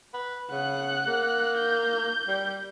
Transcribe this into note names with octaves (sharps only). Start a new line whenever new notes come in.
B4
C#3 F#5 F#6
A#3
G6
G3